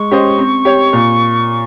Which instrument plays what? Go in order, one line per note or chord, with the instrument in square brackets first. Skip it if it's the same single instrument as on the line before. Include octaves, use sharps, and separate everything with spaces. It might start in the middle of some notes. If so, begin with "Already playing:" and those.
Already playing: [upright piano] G#3 [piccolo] C#6
[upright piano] C#4 G4 C5 D#5
C4
G4 C#5
A#2